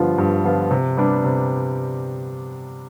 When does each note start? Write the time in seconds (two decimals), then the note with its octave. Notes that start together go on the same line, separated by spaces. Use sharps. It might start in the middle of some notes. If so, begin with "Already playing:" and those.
Already playing: G2 D3 F3 B3 F4
0.18 G2
0.44 D3 F3 B3 F4
0.71 C3
0.97 G3 B3 D4
1.24 C3